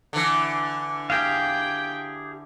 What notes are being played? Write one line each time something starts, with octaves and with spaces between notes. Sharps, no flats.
D3 E3
G4 G#4 F5 G5